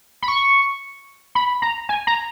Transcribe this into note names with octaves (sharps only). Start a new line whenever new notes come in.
B5
C#6
B5
A#5
G#5
A#5